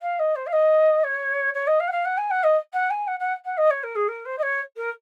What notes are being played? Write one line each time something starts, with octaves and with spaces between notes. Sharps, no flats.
F5
D#5
C5
F5
D#5
C#5
C#5
D#5
F5
F#5
F5
F#5
G#5
F#5
D#5
F#5
G#5
F#5
F#5
F#5
D#5
C#5
A#4
G#4
A#4
C5
D#5
C#5
A#4